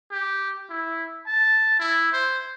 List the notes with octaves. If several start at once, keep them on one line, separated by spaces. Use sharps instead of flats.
G4
E4
A5
E4
C5